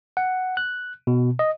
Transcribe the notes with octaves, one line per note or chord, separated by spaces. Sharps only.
F#5
F#6
B2
D#5